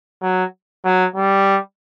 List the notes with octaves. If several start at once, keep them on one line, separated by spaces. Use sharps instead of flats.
F#3
F#3
G3